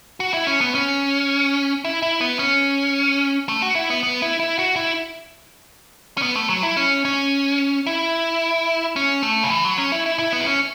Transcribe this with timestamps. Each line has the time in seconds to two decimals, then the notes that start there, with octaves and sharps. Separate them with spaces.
0.20 F#4
0.34 E4
0.47 C#4
0.61 B3
0.75 C#4
1.85 E4
2.02 E4
2.21 B3
2.39 C#4
3.49 A3
3.62 F#4
3.75 E4
3.90 B3
4.03 B3
4.22 E4
4.40 E4
4.59 F#4
4.76 E4
6.17 C#4
6.22 B3
6.36 A3
6.49 F#3
6.63 E4
6.77 C#4
7.05 C#4
7.86 E4
8.96 C#4
9.23 A3
9.43 C#3
9.51 E3
9.65 F#3
9.78 C#4
9.92 E4
10.06 E4
10.19 E4
10.33 B3
10.40 E4
10.46 C#4